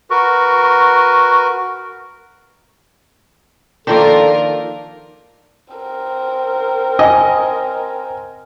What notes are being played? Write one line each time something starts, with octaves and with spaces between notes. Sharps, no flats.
F#4 A#4 B4 C#6
D#3 F3 A#3 D4 F4 A4 A#4
C4 A#4
D#5 G#5